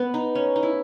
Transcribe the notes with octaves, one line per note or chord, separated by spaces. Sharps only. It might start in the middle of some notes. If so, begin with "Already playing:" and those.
Already playing: B3
D#4
C#4
D#4
E4